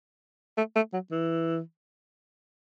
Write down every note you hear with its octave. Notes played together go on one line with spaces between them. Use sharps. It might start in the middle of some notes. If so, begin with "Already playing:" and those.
A3
A3
F#3
E3